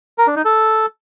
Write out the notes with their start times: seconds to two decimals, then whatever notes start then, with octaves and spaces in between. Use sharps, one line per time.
0.18 A#4
0.27 D4
0.36 D#4
0.45 A4